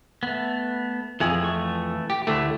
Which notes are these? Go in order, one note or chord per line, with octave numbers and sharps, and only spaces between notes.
A3 B3
F2 E3 G#4
E3 A3 C#6
G4
D2 A3 E4 G4